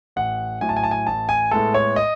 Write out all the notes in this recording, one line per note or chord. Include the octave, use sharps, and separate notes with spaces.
A1 F#5
A2 F#3 G#5
A5
G#5
A5
G#5
A1 A5
G#5
A2 G#3 B3 A4
C#5
D#5